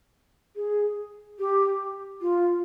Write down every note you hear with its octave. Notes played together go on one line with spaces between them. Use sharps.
G#4
G4
F4